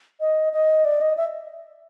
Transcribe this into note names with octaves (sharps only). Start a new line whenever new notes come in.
D#5
D#5
D5
D#5
E5